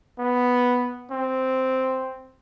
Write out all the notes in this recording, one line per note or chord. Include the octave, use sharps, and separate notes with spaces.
B3
C4